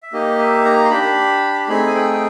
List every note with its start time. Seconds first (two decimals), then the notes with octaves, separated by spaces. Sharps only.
0.03 E5
0.13 A#3 D#4 G4 D#5
0.39 E5
0.65 A#5
0.85 C6
0.90 D4 G4 B5
1.68 A3 C4 D#4 G#4 B5
1.87 G#5
1.95 G5